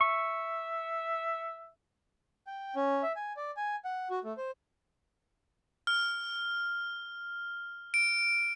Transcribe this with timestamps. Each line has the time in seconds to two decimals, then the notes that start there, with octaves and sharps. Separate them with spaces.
0.01 E5 C#6
2.47 G5
2.76 C#4
3.03 E5
3.16 G#5
3.37 D5
3.57 G#5
3.85 F#5
4.10 F#4
4.24 A3
4.37 C5
5.87 F6
7.94 D7